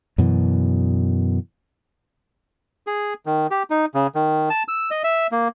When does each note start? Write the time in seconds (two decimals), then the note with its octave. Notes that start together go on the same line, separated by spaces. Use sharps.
0.18 F#2 B2 E3
2.87 G#4
3.26 D#3
3.51 G4
3.70 D#4
3.95 C#3
4.15 D#3
4.50 A5
4.68 E6
4.91 D#5
5.04 E5
5.32 A#3